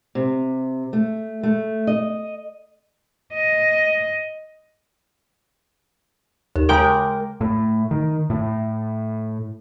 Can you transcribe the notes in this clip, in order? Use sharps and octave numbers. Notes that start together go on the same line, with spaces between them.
C3
A3
A3
D#5
D#5
D#2
C#3 G#3 A#4 G5 D6
A2
D#3
A2